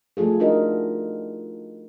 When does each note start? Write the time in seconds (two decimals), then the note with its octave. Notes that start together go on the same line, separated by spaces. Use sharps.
0.17 F3 A3 F4 G#4 A4
0.40 D4 D#4 F#4 A#4 D#5